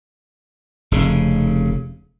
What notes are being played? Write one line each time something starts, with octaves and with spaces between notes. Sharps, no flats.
F1 C#3